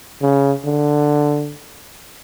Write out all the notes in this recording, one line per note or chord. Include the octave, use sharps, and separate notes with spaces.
C#3
D3